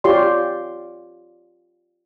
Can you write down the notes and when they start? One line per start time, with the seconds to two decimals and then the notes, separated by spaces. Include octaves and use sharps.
0.04 F4 G4 C#5 D5 C6